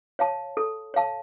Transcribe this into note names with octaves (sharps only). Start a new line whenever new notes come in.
C#5 F5 A5
A4
C#5 F5 A5